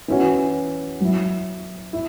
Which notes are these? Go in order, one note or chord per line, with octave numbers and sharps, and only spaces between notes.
E3 C#4 F#4
F#3 E4
E4